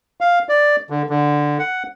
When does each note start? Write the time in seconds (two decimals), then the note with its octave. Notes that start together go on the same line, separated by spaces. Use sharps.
0.21 F5
0.49 D5
0.90 D3
1.10 D3
1.59 F#5